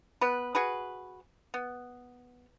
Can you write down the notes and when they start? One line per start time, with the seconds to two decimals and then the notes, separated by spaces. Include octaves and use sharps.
0.21 B3 B4
0.55 F#4 G#4 B4
1.54 B3